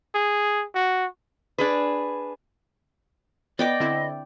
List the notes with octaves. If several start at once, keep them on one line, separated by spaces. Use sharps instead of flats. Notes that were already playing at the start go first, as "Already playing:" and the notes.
G#4
F#4
D4 G#4 B4
B3 D5 D#5 G5 D6
D3 C4 E4